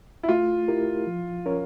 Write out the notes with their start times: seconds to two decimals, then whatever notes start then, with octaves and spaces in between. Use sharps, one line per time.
0.23 E4
0.29 A3 F4
0.68 E4 G4 A#4
1.07 F3
1.46 C#4 F4 A#4 C#5